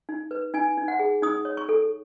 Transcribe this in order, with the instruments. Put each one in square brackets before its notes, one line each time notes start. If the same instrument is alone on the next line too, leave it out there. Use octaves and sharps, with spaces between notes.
[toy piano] D#4
B4
D#4 G#5
D#4
F#5
G#4
D#4 D#6
C#5
C#6
A4